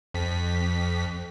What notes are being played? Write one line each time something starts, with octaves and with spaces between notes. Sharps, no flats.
F2 B6